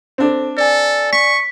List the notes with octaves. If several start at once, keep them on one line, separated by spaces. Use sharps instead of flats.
C4 D4 A4 C5
A4 D5 G#5
C#6 B6